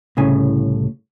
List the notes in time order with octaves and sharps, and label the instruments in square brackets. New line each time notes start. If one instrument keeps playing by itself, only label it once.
[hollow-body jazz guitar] C2 A2 C#3 G#5